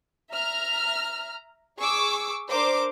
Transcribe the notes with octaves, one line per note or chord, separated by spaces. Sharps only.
E5 A#5 F6
G#4 C#6 D6 E6
D4 A#4 C5 D6